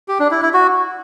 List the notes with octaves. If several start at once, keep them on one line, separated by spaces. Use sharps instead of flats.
G4
D4
E4
E4
F#4